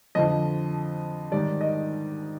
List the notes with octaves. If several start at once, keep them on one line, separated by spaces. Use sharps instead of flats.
F2 D3 F3 D#5
G#2 D#3 G3 D5
D#5